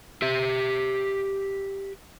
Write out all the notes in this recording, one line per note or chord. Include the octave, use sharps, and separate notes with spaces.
G4 E5